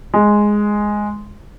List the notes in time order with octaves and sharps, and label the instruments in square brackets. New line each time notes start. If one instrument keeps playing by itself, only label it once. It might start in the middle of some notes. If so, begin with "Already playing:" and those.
[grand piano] G#3